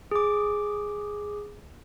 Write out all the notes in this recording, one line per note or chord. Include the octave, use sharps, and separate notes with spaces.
G#4 D6